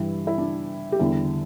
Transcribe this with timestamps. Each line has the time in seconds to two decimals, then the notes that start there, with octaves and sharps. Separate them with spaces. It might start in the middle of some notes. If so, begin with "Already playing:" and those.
Already playing: G2 E3 G3 E4
0.27 E4
0.38 D4
0.92 G4
0.99 E2 D3 G3 E4